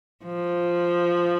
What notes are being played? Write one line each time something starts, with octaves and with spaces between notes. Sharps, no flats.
F3